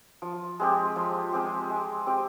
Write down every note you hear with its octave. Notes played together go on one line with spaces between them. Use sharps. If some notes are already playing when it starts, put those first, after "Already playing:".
F3
G#3 C4 G4
F3
G#3 C4 G4
G#3
C4 G4